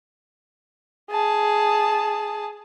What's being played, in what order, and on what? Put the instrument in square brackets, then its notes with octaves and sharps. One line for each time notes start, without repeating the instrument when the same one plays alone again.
[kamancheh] G#4 A5